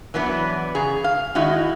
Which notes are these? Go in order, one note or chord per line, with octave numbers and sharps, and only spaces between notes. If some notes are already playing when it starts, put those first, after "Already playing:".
E3 F#3 B3 D4
C#3 G#4 A#5
F5
D#3 G#3 D#4 E4 F#4